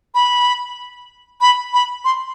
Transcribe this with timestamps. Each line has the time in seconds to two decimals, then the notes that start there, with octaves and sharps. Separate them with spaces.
0.15 B5
1.41 B5
1.74 B5
2.05 C6